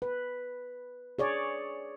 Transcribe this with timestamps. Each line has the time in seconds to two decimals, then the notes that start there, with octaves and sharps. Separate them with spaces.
0.02 B4
1.19 G#4 C#5 D5